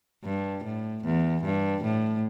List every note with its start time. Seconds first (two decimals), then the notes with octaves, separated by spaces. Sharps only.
0.25 G2
0.65 A2
1.04 E2
1.44 G2
1.83 A2